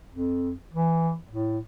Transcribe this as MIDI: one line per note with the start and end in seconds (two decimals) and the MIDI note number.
0.12 0.54 41
0.73 1.14 52
1.29 1.59 45